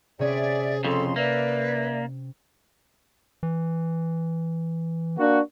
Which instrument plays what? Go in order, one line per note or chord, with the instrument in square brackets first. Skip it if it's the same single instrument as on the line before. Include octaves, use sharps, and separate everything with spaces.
[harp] C3 C#4 [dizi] G#4 [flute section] D5 E5
[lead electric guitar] F2 C#3 [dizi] A4 [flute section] C6
[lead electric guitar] A#3 [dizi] B4 [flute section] D5 E5
[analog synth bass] E3
[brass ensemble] A#3 D4 F#4